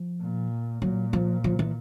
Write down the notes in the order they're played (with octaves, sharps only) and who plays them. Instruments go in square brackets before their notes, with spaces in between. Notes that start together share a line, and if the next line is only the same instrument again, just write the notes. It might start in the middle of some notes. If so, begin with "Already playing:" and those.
Already playing: [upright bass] F3
[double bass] A#2
[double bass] A#2 [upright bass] F#3
[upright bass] F3
F3
E3